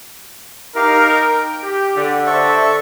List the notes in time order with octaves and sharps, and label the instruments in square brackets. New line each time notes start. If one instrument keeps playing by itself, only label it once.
[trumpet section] D#4 A#4 [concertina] G4 F5
[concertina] G5
[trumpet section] G4
[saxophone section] D3
[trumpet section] D4 C5 E5 [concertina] A4 C#6